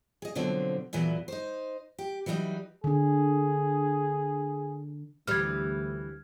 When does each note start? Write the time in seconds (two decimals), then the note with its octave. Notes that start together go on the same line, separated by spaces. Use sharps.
0.22 G#4 D#5
0.35 B2 D3 F3 F#3 C4
0.93 E2 A#2 E3 F#3
1.28 D#4 C5
1.98 G4
2.26 E3 F#3 G3 B3 D#4
2.84 D3 D4 G#4
5.27 D2 E3 G3 F6 G#6